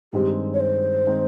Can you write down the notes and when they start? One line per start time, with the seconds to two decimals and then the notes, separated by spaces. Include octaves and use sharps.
0.13 G2 D#3 G#3 C4 G4
0.54 C#5
0.60 C5
1.07 D#3 G#3 C4